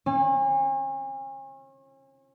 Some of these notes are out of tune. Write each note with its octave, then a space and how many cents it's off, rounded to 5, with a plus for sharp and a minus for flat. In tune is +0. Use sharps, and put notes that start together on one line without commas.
C#4 -40